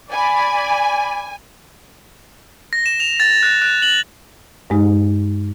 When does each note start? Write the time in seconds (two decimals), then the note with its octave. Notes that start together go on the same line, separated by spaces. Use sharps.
0.11 D5 G#5 B5
2.73 A#6
2.86 E7
3.00 F7
3.20 A6
3.43 F#6
3.62 F#6
3.82 F#7
4.70 G2 G#3 D#4